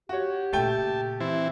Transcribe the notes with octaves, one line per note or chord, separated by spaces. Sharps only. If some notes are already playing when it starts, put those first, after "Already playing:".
F#4 G4 C#5
A#2 C#3 A3 G5 A5
E3 C4 E4